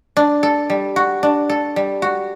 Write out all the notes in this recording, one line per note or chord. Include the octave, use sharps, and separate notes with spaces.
D4
A4
G3
F#4
D4
A4
G3
F#4